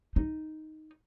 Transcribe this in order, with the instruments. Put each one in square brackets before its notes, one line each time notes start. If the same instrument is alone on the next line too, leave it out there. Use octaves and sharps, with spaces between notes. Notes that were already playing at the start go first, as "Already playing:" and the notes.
[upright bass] D#4